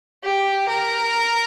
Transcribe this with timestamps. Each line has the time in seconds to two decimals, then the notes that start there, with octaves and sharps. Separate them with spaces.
0.24 G4
0.68 A#4